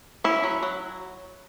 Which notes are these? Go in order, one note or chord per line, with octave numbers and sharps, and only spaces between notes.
C#4 E4
F#3
F#3